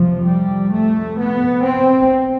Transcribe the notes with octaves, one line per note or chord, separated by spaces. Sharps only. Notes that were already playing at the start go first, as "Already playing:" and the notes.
Already playing: F2 C3 F3
G3
A3
B3
C4